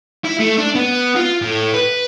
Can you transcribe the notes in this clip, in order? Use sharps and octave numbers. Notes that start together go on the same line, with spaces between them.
E4
A3
D4
B3
F4
A2
B4